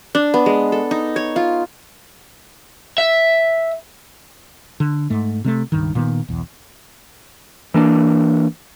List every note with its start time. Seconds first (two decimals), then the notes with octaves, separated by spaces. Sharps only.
0.15 D4
0.34 B3
0.46 G#3
0.72 A4
0.91 D#4
1.16 C#5
1.36 F4
2.98 E5
4.80 D3
5.10 G#2 A3
5.44 C3 G#3 A3
5.72 C#2 G2 D#3
5.95 A#2 D#3 A#3 B3
6.28 B1 E2
7.74 E3 A#3 D4